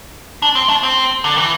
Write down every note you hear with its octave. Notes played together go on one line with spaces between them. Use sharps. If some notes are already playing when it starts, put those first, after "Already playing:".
D4
C4
D4
C4
D3
E3